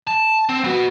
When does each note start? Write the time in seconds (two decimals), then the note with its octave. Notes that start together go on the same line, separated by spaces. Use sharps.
0.07 A5
0.49 C4
0.64 B3 F#4